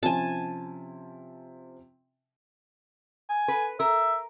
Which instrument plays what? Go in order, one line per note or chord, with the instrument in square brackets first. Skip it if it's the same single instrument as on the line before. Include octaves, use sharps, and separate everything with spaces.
[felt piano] C3 F3 C#4 [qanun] G#5 A5
[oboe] G#5
[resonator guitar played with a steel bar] B4
[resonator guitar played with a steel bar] A#4 [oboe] E5